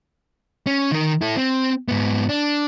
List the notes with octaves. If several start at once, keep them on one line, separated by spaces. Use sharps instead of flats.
C#4
D#3 A#4
E4 A4
C4
G#2 B3
D4